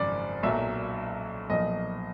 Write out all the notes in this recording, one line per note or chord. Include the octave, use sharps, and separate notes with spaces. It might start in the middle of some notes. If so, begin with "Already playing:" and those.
Already playing: G#1 F#2 C#3 F3 D5
B1 A#2 F#3 E5
B1 A#2 F3 D#5